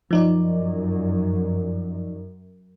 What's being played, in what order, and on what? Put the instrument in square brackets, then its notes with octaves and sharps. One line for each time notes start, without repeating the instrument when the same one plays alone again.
[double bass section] F#2 [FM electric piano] F3 D#4 D5